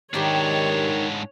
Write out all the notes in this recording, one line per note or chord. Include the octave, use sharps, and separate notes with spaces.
G#2 D#3 D4 D#4 G4 C#5 G5